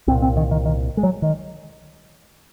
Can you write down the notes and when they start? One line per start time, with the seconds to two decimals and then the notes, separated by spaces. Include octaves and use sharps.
0.07 C2 C4
0.11 A#2
0.22 C4
0.37 D#3
0.51 D#3
0.65 D#3
0.97 G#3
1.03 F#3
1.22 D#3